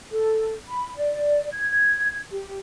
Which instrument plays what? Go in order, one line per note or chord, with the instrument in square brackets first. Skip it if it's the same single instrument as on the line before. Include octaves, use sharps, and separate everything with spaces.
[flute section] A4
B5
D5
G#6
G4